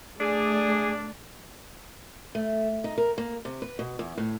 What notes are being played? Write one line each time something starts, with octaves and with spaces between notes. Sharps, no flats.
A3 D4 G#4 D5
A3
D#4
A#4
A#3
C3
B4
B2
E2
A2